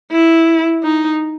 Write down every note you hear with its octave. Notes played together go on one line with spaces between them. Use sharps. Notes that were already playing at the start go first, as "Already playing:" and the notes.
E4
D#4